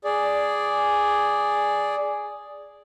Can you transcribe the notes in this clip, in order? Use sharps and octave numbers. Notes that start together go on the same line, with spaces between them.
G#4 D5